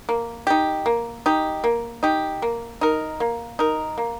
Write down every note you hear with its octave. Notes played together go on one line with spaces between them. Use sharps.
A#3
D#4 G4
A#3
D#4 G4
A#3
D#4 G4
A#3
D#4 A#4
A#3
D#4 A#4
A#3